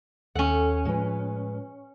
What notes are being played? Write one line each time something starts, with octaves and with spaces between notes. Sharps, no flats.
D#2 C#4 A4 F#5 G5
A2 F3 G#3 B4